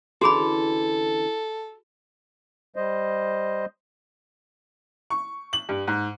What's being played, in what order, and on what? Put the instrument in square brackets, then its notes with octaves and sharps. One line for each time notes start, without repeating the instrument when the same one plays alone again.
[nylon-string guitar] D3 E3 C#4 [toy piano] F#4 G#4 B5 [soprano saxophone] A4
[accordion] G3 C5 D#5
[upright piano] C#6
F#7
G2
G#2